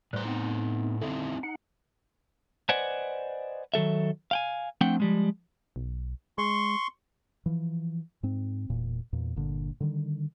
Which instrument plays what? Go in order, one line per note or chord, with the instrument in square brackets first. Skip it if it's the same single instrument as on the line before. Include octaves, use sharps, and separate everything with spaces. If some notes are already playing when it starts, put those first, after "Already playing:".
[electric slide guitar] A2 C5 [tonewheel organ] G3 B4
[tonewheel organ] B3 C4 D#4
[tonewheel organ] D3 [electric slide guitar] C4 D#4 E4
[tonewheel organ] D#4 F#5
[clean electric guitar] B4 C5 D5 D#5 F#5 G#5
D#3 F#3 A4 E5
F5 G5 G#5
F3 A3 C4 D4 F#5 G5
F3 G3 G#3
[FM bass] B1
[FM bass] G#3 [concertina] C6 C#6
[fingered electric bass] E3 F3
G#2 C4
E1 A#2
E2 A#2
G1 A#2 D3
D3 D#3 G3